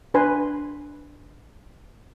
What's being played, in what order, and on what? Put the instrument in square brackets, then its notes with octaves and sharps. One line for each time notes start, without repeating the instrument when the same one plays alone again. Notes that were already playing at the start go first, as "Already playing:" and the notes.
[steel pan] D4 B4 G#5 C6